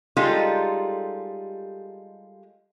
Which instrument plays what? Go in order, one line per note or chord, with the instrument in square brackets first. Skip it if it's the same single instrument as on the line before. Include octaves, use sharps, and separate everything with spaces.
[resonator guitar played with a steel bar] G3 G#3 D#4 F4 G4 A4